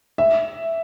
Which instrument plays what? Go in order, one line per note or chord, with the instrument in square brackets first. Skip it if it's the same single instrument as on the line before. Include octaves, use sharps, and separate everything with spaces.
[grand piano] E5